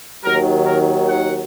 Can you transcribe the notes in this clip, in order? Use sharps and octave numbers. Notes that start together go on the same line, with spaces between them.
D#2 D#3 F#3 A#4
A#4
F#5